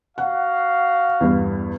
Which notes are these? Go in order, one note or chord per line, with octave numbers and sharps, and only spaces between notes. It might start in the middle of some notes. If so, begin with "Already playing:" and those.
F#4 F5 F#5
E2 G2